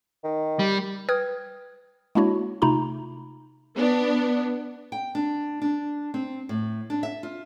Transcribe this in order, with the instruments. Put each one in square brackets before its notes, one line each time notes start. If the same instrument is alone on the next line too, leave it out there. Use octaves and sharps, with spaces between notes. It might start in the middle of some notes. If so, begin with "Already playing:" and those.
[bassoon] D#3
[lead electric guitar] G3
[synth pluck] B4 G5 D#6 F6 G#6
G#3 A#3 D4 E4 F#4 C#5
C3 A3 D#4 F4 A#5 B5
[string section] B3 D4
[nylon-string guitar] G5
D4
D4
C4
A2
D4
E5
F4